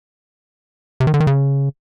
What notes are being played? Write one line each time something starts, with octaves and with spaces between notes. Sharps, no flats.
C3
D#3
D3
D#3
C#3